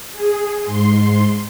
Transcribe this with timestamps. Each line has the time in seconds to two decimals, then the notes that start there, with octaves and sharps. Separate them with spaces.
0.12 G#4
0.63 G#2 C6